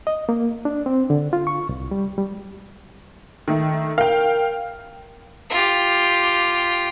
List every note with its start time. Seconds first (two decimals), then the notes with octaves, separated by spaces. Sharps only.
0.07 D#5
0.29 A#3
0.65 D4
0.86 C4
1.10 D3
1.33 F4
1.47 C#6
1.69 C2
1.91 G3
2.18 G3
3.48 D#3 A3
3.98 A#4 F5 G5
5.50 F4 G4